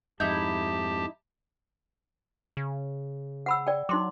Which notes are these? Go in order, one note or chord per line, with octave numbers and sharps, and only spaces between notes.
F2 G#2 D#4 E4 G4 A5 G6
C#3
F#5 B5 E6
D5 G5
F#3 D#4 C6 D6